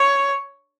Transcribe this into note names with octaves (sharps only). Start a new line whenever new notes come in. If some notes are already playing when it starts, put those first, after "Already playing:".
Already playing: C#5